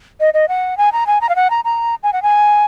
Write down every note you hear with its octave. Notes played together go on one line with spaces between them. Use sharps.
D#5
D#5
F#5
G#5
A#5
G#5
A#5
F5
F#5
A#5
A#5
G#5
F#5
G#5